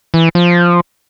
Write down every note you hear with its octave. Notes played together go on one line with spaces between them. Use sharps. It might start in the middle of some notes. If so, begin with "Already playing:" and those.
E3
F3